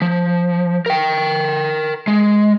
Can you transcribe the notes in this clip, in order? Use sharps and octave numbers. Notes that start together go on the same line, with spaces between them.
F3
A#4 G5
G#3